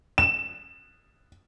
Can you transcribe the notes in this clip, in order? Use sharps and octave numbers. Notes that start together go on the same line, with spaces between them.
E7